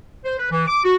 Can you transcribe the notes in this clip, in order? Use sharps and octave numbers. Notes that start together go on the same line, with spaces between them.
C5
B4
E3
D6
F#4